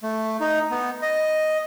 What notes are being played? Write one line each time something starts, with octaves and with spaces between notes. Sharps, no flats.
A3
D#4
B3
D#5